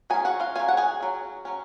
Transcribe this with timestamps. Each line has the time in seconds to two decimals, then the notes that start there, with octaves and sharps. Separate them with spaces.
0.10 F#3 C#4 G#4 G#5
0.25 F#4 F#5
0.40 F4 F5
0.55 F#3 C#4 G#4 G#5
0.68 F#5
0.77 G#4 G#5
1.01 F#3 C#4
1.45 F#3 C#4